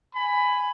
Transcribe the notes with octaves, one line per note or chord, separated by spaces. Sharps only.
G#5 B5